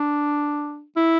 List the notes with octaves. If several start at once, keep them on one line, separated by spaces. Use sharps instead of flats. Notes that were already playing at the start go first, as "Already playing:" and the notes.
Already playing: D4
E4